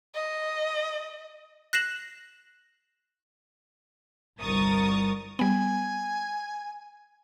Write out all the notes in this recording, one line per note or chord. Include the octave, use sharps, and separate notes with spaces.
D#5
F#6 A#6 C7 E7 F#7
G1 C2 A#4 C#6 D#6 A6
G3 B3 G#5